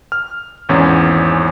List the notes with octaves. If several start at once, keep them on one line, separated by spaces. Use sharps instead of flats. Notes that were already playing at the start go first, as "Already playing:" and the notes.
F6
G#1 E2 C#4